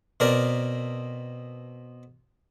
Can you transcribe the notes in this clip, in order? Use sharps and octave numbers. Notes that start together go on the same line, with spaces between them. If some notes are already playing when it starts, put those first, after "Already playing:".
B2 C4 A#4 D5